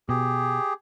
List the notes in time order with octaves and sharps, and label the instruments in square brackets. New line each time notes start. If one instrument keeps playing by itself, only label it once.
[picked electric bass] B2 [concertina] G4 G#4